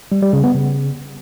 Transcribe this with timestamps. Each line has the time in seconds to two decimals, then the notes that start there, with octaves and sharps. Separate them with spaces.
0.12 G3
0.22 G3
0.33 C#3
0.44 B3
0.54 C#3